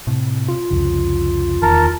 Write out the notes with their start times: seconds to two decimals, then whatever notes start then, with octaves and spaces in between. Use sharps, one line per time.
0.07 A2 C3
0.48 F4
0.70 C2 F2 C#3
1.62 D1 E2 D#3 A#4 A5